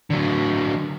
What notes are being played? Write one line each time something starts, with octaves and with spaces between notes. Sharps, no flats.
D3 F#3